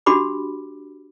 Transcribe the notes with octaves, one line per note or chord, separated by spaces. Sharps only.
D4 F#4 G4 B5 D6